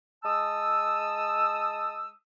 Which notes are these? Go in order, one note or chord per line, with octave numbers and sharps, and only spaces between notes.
G#3 A5 D#6 E6